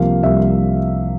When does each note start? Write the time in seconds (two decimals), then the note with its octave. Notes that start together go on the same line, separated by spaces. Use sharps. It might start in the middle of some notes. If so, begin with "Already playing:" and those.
Already playing: C2 C3 F3 A#3 F5
0.23 C2 E5